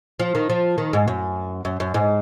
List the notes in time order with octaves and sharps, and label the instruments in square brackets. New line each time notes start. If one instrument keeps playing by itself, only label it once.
[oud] F3
D#3
F3
D#3
G#2
F#2
F#2
F#2
G#2